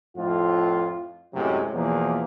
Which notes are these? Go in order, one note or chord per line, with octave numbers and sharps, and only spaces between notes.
F2 A2 F4
F#2 A2 C3 F#3 G#3
E2 B2 F3 A#3